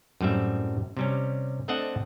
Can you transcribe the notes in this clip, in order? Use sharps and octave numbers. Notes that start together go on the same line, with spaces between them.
F#2 A2 G3 C4 E5
C3 G3 C#4
A3 C4 D4 D#5 F#5 A5